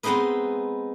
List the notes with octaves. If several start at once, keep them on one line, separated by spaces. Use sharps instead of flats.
G#3 B3 C4 D#4 G#4 B4